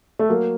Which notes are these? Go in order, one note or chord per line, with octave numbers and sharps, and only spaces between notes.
A3
F#3 A#3